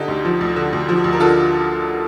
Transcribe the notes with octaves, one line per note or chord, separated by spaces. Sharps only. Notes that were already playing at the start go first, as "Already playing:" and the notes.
Already playing: D3 D#4 G4
D2
F3
D2
D3
D2
F3
D2
A#4
D3 F4 A4